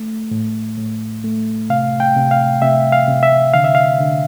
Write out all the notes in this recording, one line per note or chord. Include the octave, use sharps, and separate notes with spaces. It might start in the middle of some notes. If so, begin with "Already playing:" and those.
Already playing: A3
A2
A2
A3
C3 F5
G5
C3
F5
C3 E5
F5
C3
E5
D3 F5
E5
F5
D3